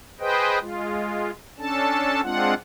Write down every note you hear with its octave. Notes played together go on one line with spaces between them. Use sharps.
G#4 B4 C5 D#5 G5
G#3 F4
C#4 D4 A4 A5
G#3 C4 D4 F4 F#5